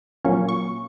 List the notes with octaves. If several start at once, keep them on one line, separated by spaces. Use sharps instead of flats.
A#2 F#3 A#3 C#4 C#6
C#6